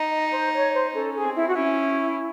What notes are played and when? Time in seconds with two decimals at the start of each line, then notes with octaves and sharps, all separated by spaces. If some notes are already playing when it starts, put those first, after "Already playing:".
Already playing: D#4
0.11 D#5
0.32 C5
0.53 C#5
0.73 C5
0.94 C#4 A4
1.15 G#4
1.25 C4
1.36 E4
1.46 F#4
1.55 C#4 E4